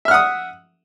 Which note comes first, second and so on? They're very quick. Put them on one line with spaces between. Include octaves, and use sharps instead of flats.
E5 F6 F#5 D#6